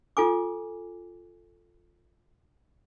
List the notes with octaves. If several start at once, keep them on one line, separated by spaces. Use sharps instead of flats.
F4 A4 G#5 D6